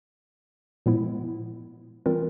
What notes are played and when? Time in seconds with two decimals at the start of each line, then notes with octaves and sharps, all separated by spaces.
0.86 A#2 F3 G#3 B3 E4
2.06 E3 G3 C4 F4 A#4